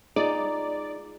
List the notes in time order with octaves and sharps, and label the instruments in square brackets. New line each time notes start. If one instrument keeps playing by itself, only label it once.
[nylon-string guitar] D#4 [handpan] F4 G#4 [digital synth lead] D5